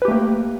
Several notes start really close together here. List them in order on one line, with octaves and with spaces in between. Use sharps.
B4 G4 A3 A#3